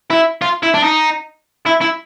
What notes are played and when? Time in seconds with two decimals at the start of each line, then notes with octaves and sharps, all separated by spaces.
0.10 E4
0.42 F4
0.63 E4
0.74 D4
0.83 D#4
1.67 E4
1.82 E4